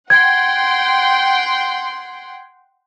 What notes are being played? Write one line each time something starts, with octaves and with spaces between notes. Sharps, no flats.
F#5 G5 C6 G#6